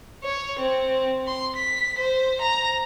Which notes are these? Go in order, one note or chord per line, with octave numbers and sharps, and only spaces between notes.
C#5
C4
C6
B6
C5
A#5